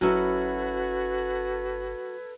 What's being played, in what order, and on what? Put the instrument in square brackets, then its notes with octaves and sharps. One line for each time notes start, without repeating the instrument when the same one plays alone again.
[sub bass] G1 [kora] F#3 C#4 E4 [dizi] F#4 [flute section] A4 B4 G#6